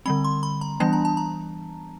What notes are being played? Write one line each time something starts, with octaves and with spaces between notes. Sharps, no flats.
D3 G3 C4 B5
C6
B5
A#5
E3 G3 B3 D4 A5
A#5
A5
A#5